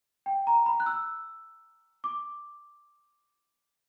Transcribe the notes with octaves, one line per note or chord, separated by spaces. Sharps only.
G5
A#5
B5
F#6
E6
D6